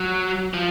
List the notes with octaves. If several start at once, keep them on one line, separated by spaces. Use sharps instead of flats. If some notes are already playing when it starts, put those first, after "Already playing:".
Already playing: F#3
F3